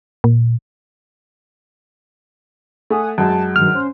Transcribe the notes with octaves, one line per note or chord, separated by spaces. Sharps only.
A#2
A3 F#5 G#5 D#6
F#2 G#3 A5
G2 D#3 F#3 F6
C#4 C5